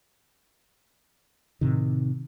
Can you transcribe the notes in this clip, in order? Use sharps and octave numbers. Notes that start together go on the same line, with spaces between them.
A2 C3 D#3